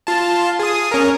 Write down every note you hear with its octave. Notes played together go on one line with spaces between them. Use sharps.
F4 A5
G#4 D#6
C#4 A#4